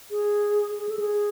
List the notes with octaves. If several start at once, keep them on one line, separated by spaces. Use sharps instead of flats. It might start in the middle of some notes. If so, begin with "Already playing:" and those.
G#4
G#4
A4
G#4